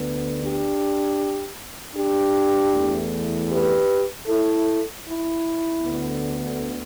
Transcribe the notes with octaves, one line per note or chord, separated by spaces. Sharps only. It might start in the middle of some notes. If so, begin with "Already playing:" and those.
Already playing: D2 D3 B3
D4 G4
D4 G4
E2 E3 A3
G4 B4
E4 A4
E4
D2 D3 B3